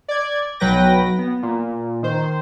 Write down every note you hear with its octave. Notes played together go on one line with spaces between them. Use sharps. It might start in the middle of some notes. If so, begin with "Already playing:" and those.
D5 G#6
B1 F#3 B4 G5 A#6
B3
A#2
D#3 C5